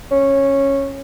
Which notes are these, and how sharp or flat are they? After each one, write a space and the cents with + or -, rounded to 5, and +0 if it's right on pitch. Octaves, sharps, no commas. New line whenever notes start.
C#4 -10